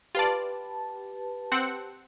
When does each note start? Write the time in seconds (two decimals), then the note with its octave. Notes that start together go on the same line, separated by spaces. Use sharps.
0.15 F4 G4 B4 D5 A5
1.52 C4 F#5 C#7